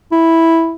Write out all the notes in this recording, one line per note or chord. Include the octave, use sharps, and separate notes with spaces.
E4